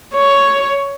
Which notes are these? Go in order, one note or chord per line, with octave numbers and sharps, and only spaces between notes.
C#5